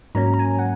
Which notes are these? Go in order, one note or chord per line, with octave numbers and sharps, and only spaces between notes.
G#2 F#3 A#3 C#4 A#5
A#5
G#5
F#5